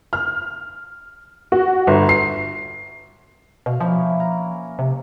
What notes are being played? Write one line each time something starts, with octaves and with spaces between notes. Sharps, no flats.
F6
F#4
G1
C7
B2 F5
F3 A#3 C#4 E4
A#5
C3